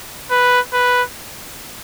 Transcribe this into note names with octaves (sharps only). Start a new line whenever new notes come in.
B4
B4